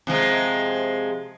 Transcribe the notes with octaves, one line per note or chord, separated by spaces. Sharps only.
C3 F3 G#3